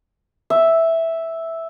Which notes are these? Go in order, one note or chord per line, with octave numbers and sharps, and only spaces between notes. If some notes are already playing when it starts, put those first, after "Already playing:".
E5